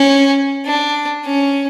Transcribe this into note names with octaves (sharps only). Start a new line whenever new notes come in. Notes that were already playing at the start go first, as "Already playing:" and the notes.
Already playing: C#4
D4
C#4